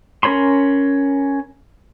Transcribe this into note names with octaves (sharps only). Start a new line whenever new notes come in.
C#4 A#4 C#5 B5 C6